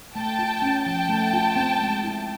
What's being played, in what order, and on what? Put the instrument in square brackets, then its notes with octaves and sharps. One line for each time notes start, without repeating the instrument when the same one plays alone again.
[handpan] A3 [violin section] G5 A5
[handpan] F4
C#4
[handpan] F3 [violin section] G5 A5
[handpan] A3
F4
C4
G#3
E4